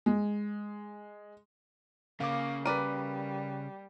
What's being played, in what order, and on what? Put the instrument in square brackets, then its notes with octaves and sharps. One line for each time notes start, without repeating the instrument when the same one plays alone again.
[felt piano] G#3
[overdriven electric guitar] C#3 [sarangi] A#3 [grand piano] F5 D6
[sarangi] G3 [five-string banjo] A#4 D5 [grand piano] B4 D#7